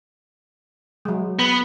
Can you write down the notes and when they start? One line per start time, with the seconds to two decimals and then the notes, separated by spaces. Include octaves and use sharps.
1.05 F#3 G#3
1.39 B3